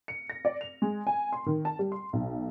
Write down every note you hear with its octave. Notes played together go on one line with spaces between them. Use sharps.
C#7
A#6
D5
F7
G#3
G#5
C6
D#3
A5
G3
C6
B1